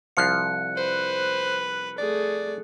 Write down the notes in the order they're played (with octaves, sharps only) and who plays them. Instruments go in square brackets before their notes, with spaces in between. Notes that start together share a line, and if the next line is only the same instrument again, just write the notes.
[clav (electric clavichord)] C2 F3 F5 [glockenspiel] F#6 C#7
[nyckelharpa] B4 [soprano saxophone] C5
[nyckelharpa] A3 G#4 [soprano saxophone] D5